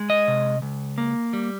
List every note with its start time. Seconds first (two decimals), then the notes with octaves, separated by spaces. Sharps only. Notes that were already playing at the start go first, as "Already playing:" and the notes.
Already playing: G#3
0.10 D#5
0.28 C3
0.62 C#2
0.98 A#3
1.33 G3